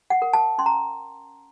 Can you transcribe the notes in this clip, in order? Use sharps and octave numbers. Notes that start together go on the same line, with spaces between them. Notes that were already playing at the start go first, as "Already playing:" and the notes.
F#5
A#4
A5
C#4 C6
A#5